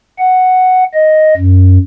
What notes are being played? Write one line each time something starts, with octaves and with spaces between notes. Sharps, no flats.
F#5
D#5
F#2